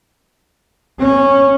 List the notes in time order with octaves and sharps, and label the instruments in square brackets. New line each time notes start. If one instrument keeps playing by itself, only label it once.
[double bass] C#4